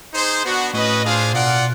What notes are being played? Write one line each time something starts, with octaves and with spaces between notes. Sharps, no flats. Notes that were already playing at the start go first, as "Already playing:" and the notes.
D#4 G#4 C5
B3 D4 F#4
A2 C#4 F#4 B4 D#5
D4 F4 G#4 C5 F5
B2 F4 A#4 D5 F#5